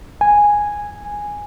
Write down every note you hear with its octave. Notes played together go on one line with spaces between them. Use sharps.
G#5